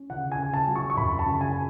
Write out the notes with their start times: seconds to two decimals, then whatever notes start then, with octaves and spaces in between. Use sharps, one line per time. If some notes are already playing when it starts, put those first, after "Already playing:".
Already playing: C#4
0.10 C#3 F#5
0.32 G#5
0.39 C#3
0.54 A5
0.68 F#3
0.76 C#6
0.90 C#6
0.97 F#2 B5
1.19 A5
1.26 C#3
1.41 G#5